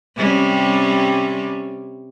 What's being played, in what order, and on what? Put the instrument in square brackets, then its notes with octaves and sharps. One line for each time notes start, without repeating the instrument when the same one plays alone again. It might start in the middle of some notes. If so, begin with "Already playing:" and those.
[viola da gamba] C3 G3 C#4